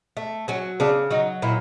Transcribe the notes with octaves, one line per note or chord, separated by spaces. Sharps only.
A3
F#3 C#4
C#3 D4
F#3 D#4
A#2 E4